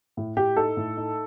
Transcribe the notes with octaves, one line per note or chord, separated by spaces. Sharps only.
A2
A2 G4
D#4 A4
A2
D#4